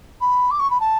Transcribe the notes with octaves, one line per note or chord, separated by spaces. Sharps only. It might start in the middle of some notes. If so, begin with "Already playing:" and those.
B5
D6
C#6
B5
A5